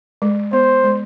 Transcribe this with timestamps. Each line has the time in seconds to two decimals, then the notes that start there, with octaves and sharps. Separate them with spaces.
0.22 G#3
0.53 B3 C5
0.84 G#3